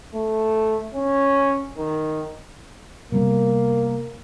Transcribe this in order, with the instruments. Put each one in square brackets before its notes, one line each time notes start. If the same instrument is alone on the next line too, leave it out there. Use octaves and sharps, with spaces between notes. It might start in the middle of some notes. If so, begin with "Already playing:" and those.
[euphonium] A3
C#4
D#3
[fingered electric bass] C3 G3 B3 [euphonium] A#3